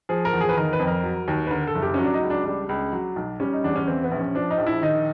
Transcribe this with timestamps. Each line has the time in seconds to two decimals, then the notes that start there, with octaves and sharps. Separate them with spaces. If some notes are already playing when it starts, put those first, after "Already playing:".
0.09 F3 G#4
0.25 A#4
0.33 E2
0.41 G#4
0.49 B4
0.57 D#3 A#4
0.73 B4
0.79 F2
0.87 A#4
1.03 F#3
1.28 D#2
1.47 B4
1.51 D3 A#4
1.67 A4
1.75 F#1
1.82 G4
1.94 F#3 C#4
2.04 D4
2.14 D#4
2.23 C#2
2.30 D4
2.45 G3 D4
2.69 C#2
2.93 F#3
3.16 B1
3.40 G3 C#4
3.53 D#4
3.64 E2 D4
3.76 C#4
3.87 E3 C4
4.04 B3
4.11 A#1
4.20 C#4
4.35 F3 D4
4.50 D#4
4.58 A#1
4.66 E4
4.82 D#3 D#4